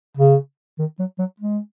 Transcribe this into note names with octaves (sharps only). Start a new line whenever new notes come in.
C#3
D#3
F#3
F#3
G#3